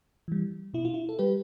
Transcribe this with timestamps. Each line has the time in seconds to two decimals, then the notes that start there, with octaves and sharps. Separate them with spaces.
0.28 E3 G3
0.74 B2 E4
0.85 F4
0.94 E4
1.09 A4
1.19 G3 G4 B4